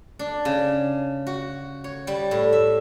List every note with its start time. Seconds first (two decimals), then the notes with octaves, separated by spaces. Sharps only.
0.19 D4
0.45 C#3
1.27 F#4
1.84 C#5
2.07 G3
2.31 A2
2.52 E5